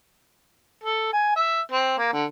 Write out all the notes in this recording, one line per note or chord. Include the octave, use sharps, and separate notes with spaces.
A4
G#5
E5
C4
A#3
D3